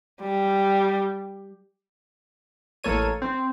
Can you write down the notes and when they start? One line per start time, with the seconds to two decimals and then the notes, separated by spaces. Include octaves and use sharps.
0.21 G3
2.84 A1 A#3 A4 C#5 D#7
3.22 C4